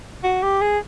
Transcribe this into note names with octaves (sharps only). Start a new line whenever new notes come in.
F#4
G4
G#4